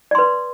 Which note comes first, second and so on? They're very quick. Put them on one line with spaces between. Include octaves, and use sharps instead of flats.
D5 C6 B4